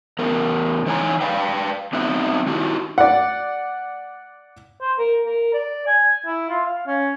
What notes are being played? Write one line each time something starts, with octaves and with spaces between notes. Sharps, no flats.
E2 B3 A#4
E3 D#4 C#5 G#5 A#5
B4 D5 F5 G5
F#3 B3 C4 D#4 F#4 E5
D#3 D#4 E4 F#4 G4
D5 F#5
C5
A#4
A#4
D5
G#5
E4
F4
F5
C#4